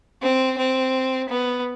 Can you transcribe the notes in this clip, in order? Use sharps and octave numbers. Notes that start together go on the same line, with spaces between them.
C4
C4
B3